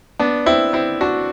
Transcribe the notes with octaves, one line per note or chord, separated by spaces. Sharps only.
B3 D4
C4 E4
C4 E4
D4 F#4